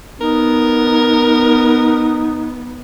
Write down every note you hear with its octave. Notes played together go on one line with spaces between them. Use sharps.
B3 D#4 A#4